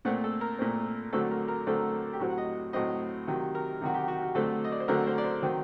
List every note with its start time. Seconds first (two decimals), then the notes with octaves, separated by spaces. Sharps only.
0.05 A#2 A3 C4 F#5
0.24 A4
0.41 A#4
0.58 A#2 A3 C4
1.13 D3 F#3 A3 C4 A4
1.31 A#4
1.48 A#4
1.67 D3 F#3 A3 C4 A4
2.13 G4
2.20 A2 F#3 C4 F#4
2.30 F#5
2.38 D#5
2.73 A2 F#3 C4 D#5
3.27 C3 D#3 F#3
3.55 A#4
3.81 C3 D#3 F#3 F#4
3.94 G4
4.08 F#4
4.22 F#4
4.35 D3 F#3 A3 C4 A4
4.64 D#5
4.72 D5
4.80 C5
4.88 D3 F#3 A3 C4 A#4
5.07 C5
5.18 D5
5.24 C5
5.42 D#3 F#3 C4